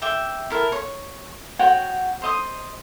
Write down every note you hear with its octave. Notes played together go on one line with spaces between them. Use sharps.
E5 G5 D6
E4 A#4 A5
C#5
F#4 C#5 F#5 G5
C5 D#5 D#6